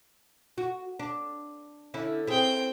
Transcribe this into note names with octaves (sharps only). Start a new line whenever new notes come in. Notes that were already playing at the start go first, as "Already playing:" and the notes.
F#4
D4
D3 C#4 E4
C4 E4 G#4 G5